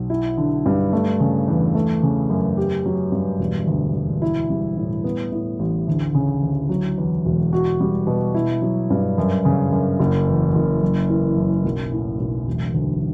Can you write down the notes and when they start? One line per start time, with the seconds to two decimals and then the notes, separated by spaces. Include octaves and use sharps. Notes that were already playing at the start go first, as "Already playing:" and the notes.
Already playing: B1
0.10 E4
0.37 D3
0.66 G2
0.93 A3
1.20 C#3
1.47 E2
1.74 A3
2.03 C#3
2.30 F#2
2.57 G4
2.86 F#3
3.12 G2
3.39 E1
3.67 D2
3.95 E1
4.22 E4
4.50 G3
4.77 A2
5.04 B3
5.32 A2
5.59 A1
5.88 D2
6.15 C#3
6.42 D2
6.69 F#3
6.98 E2
7.25 E1
7.53 F#4
7.80 G3
8.07 B2
8.35 E4
8.62 F#3
8.90 G2
9.18 F#2
9.45 C#3
9.72 F#2
9.99 F#1
10.28 E2
10.55 F#1
10.82 F#2
11.10 E3
11.37 F#2
11.64 B1
11.91 A2
12.20 B1
12.47 E1
12.74 D2